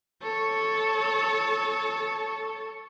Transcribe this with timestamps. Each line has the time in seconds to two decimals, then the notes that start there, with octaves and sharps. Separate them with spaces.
0.22 A4 C#5